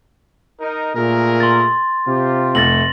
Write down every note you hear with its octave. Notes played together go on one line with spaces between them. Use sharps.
D#4 A#4
A#2 A3 G#4 A#4
C6 A6
C3 F4 G4
F1 A3 A6 A#6 F#7